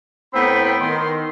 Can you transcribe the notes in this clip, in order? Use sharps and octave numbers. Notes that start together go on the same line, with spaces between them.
A2 B3 C4 G5 A#5 B5
D#3 C6